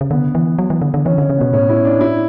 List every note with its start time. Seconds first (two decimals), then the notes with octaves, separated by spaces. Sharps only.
0.01 C#3
0.11 D3 B3
0.35 E3
0.59 F#3
0.70 E3
0.82 D3
0.94 D3
1.05 E3 C#4
1.18 D3 C#4
1.30 C#3
1.37 B2 B3
1.53 A2 C#4
1.70 E4
1.85 D4
2.01 E4